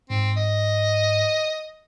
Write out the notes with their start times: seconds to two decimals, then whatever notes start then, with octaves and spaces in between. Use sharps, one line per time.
0.10 G#2 C4
0.37 D#5